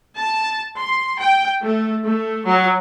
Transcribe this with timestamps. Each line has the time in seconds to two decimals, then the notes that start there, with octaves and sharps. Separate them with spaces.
0.14 A5
0.79 C6
1.20 G5
1.62 A3
2.03 A3
2.44 F#3